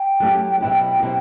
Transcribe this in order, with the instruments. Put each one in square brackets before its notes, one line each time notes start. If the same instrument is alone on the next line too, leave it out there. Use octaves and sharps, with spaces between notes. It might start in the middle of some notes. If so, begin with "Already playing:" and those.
Already playing: [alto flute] G5
[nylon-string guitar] F#3 A3 E4 G4
B2 F#3 C4 E4 G4
B2 F#3 C4 E4 G4